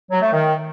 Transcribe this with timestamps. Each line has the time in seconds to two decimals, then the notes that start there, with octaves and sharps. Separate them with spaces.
0.11 F#3
0.22 A3
0.32 D#3